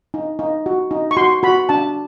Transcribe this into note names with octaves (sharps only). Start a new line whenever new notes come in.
D#4
D#4
F#4
D#4
C#6
F#4 C6
F#4 B5
D4 A5